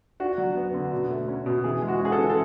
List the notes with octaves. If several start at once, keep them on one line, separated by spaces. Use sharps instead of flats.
D4 F#4
F#3
B3
D3
B2
A3
C#4
B2
E3 G#4
G#3
F#4
C#4
G#4
A4
E3
A4